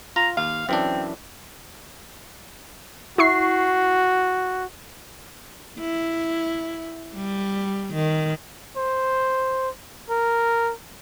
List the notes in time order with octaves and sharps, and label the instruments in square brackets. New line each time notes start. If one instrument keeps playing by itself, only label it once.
[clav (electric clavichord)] F4 [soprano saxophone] A#5
[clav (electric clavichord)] D#2 [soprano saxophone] F5
[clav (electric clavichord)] F#2 E3 D4 [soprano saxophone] C4
[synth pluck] E4 C#6 C7 [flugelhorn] F#4
[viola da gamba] E4
G3
D#3
[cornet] C5
A#4